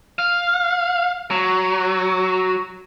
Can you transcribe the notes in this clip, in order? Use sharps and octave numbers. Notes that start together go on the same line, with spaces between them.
F5
F#3